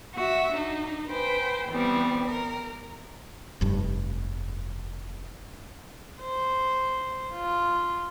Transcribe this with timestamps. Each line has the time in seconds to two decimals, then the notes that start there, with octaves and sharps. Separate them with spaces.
0.15 F#4 E5
0.53 D4 D#4
1.09 B4 C5 G5 G#5
1.70 E3 G3 B3 C4
2.26 A#4
3.61 F1 G2
6.21 C5
7.34 F4